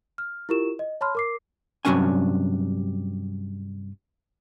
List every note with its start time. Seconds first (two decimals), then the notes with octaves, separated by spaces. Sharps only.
0.18 F6
0.49 E4 F4 G4 A#4 C#6 E7
0.79 D#5
1.01 C#5 A5 B5 C6 F6
1.15 A#4 D6 C7
1.85 G2 C3 F#3 C#4 D4 G#5